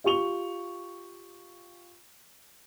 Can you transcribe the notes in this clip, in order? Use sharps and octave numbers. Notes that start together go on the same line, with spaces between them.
F4 G4 C#6 F7 G7